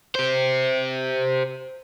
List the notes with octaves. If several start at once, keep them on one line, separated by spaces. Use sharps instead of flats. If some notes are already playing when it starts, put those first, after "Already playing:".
G4 C5